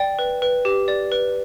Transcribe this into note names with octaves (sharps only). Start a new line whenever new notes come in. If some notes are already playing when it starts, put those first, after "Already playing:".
Already playing: D5 G5
B4
B4
G4
D5
B4